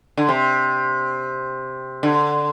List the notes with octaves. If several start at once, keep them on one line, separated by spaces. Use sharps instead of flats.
D3
C3
D3